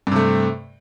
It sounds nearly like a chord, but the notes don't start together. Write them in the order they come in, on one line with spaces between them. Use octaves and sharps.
G2 C3 A3